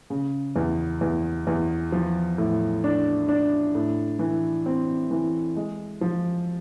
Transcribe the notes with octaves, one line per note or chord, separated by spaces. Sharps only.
C#3
E2
E2
E2
F3
A2
D4
D4
A2
E3
C4
E3
G#3
F3